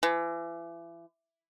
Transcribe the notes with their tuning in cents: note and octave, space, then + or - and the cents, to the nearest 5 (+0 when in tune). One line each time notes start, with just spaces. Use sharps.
E3 +35